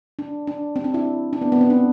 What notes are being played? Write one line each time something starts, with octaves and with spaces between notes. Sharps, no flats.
D4
D4
C4
D4
E4
D4
B3
B3
C4
D4